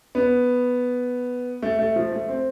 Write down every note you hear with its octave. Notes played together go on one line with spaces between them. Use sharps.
B3
A3
A3
F3
A3
C4